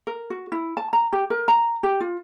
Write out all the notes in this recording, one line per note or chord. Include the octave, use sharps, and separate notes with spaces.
A#4
F#4
E4
A5
A#5
G4
A#4
A#5
G4
F4